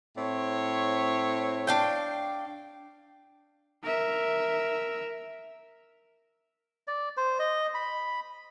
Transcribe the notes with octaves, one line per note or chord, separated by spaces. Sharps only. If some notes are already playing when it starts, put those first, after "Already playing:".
A2 C4 C#5
D4 F5 G5
A#4 E5
D5
C5
D#5
B5